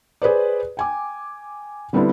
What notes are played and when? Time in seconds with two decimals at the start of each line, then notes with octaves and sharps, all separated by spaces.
0.22 G#4 B4 C5 D5
0.77 G5 G#5 D6
1.93 D3 G3 B3 C4 D4 E4